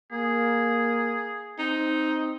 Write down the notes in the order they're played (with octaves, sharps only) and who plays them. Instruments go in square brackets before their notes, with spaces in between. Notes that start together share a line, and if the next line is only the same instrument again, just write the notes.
[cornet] A#3 [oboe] G#4
[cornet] C4 [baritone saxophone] D#4